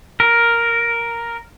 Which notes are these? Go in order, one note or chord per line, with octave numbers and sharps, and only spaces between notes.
A#4